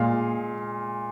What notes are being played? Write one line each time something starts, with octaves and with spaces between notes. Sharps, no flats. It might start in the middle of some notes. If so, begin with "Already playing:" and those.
Already playing: A#2 G#3 F5